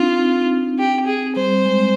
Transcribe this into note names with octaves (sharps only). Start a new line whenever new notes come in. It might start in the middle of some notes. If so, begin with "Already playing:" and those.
Already playing: C4 D4 D#4 F4
C4
G4
G#4
G3 C5
G#3